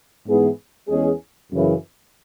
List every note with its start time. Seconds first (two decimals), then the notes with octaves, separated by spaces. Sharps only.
0.27 G#2 E3 B3 G#4
0.88 E2 E3 G#3 C#4 G#4
1.51 F#2 C#3 E3